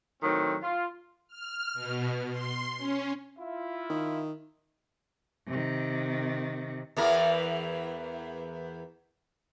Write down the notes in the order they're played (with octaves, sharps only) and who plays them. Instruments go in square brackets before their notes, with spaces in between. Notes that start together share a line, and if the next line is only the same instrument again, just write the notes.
[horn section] A2 D#3 F#3 C4
F4
[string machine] F6
B2
C6
C#4
[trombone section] E4 F4 [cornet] E5
[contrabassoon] D#3
[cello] C3 D#3
[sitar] E2 E3 A#4